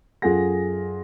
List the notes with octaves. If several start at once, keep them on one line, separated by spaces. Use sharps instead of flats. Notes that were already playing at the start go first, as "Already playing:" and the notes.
F#2 F4 G#4 A4 F#5 A#6